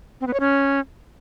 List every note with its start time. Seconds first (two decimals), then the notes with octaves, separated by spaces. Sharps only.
0.21 C4
0.27 B3
0.34 C#5
0.40 C#4